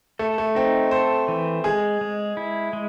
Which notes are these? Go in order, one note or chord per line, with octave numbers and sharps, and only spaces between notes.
A3 A4
A3
C4 D#4
A4 C5
E3
G#3 G#4
G#3
E4
G#3